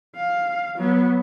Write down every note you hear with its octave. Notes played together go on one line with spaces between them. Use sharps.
F5
F#3 B3